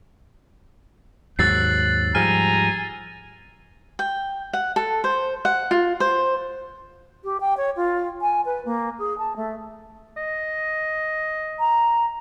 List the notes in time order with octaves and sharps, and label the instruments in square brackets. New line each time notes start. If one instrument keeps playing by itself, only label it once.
[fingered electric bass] D#2 G#2 F#3 [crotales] E6 A6 C7 [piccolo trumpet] F#6
[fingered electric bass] G#2 F3 G3 [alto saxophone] G#5 [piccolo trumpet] A#5 [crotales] F6
[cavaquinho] G5
F#5
A4
C5
F#5
F4
C5
[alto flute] G4
G5
C#5
F4
G#5
B4
A#3
G#4
A5
A3
[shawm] D#5
[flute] A#5